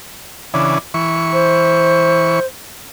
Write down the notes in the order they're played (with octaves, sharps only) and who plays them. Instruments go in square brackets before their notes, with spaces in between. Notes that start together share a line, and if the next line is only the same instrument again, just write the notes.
[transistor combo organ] C#3 E3 D4
E3 C#6
[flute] C5